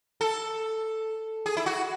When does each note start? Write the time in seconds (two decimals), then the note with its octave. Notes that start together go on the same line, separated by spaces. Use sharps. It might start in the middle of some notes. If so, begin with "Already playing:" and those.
0.21 A4
1.46 G#4
1.57 E4
1.66 F#4